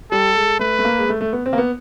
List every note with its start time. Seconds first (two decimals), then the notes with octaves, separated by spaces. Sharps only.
0.11 G3 A4
0.35 G#3
0.59 A3 B4
0.79 A3
0.85 A#3
0.99 G#3
1.09 A3
1.21 A3
1.33 B3
1.46 C4
1.53 A#3
1.58 B3